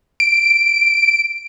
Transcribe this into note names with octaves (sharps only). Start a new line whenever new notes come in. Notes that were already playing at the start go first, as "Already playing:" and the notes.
D7